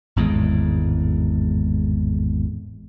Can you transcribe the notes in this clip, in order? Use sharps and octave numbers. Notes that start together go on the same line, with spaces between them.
G#1 E2 A2 G#3